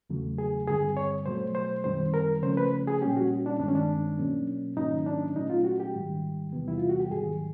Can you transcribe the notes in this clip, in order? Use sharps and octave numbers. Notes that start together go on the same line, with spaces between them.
E2 C#3 F#3 A3
G#4
G2 D3 G3 C4 G#4
C#5
B2 F#3 A3 C5
C5
F#2 D#3 G3 C4 C5
A#4
C#3 F3 A3 C#4 C5
B4
G#4
A#2 G3 A#3 C#4 G4
F#4
D4
G2 D#3 G#3 C4 D4
C#4
D4
B2 F#3 A#3 C#4
G#2 D#3 F#3 A#3 C#4 D#4
D4
A#2 F#3 A3 C#4 D#4
F4
F#4
G4
G#2 D#3 G3
E2 C3 E3 G3 B3
E4
F4
F#4
G4
G#2 D#3 F#3 G#4